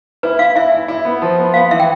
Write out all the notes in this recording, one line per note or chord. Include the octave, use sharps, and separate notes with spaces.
E4 B4
E4 F5
E4 E5
E4
E4
B3
F3
B3
B3 F5
E3 E5
G5